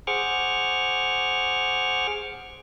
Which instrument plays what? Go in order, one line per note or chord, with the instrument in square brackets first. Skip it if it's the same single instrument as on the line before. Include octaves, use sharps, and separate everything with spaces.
[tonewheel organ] G#4 C5 F#5 C#6 D6 F6